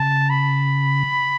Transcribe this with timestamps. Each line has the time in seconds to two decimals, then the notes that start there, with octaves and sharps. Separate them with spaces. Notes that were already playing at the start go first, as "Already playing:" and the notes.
Already playing: C#3 A5
0.30 B5